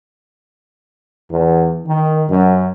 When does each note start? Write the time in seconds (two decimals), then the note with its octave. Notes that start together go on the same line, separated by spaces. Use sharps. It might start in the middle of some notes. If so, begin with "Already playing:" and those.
1.30 E2
1.86 D#3
2.29 F#2